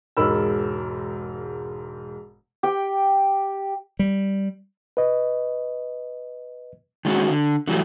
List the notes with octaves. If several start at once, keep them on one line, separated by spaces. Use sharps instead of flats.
E1 G#2 A#4 D#5 B5 E6
G4 G5
G3
B4 D#5
D#3 G#3 C#4 F#4
D3
D3 E3 F#3 G3 A3